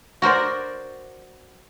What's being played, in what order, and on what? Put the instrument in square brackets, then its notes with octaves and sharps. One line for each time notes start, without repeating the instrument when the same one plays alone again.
[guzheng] F#4 A#4 C5 D5